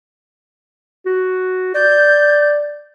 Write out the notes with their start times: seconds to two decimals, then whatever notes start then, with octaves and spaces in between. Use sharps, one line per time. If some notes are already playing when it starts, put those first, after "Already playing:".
1.06 F#4
1.75 D5 G6